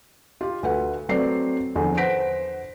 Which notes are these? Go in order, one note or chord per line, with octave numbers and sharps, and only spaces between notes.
F4 G4
D2 A3 B4 F#5
F#3 A3 C4 B4 D5 C7
E2 D3 F3
B4 C5 F#5 A#6 B6 D7